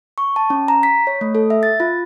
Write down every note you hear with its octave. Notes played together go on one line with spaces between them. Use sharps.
C#6
A5
C#4
A#5
B6
C#5
A3
A4
E5
A6
F4